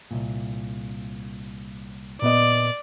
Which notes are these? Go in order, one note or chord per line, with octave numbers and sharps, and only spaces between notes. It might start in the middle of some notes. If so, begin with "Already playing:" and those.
C2 A#2
A#2 B3 D5 D#5